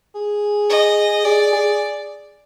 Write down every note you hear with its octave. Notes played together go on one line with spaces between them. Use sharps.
G#4
D#5
G#4 D5
G#4